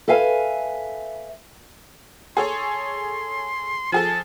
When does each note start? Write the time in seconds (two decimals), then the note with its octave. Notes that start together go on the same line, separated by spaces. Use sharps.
0.08 A4 B4 E5 F5 G#5
2.37 G#4 A4 C#5 C6
3.92 F3 G#4 A4 A5